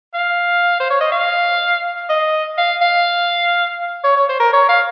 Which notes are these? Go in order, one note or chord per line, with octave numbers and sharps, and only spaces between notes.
F5
C5
C#5
D#5
F5
D#5
F5
F5
C#5
C#5
C5
A#4
C#5
F5